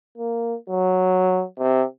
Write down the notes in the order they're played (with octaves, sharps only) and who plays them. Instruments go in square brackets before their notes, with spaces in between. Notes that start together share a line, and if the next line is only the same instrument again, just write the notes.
[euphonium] A#3
F#3
C3